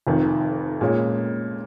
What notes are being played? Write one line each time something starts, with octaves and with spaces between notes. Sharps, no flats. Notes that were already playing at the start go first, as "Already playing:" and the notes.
F1 F2 D#3
A#2 G#3 C#4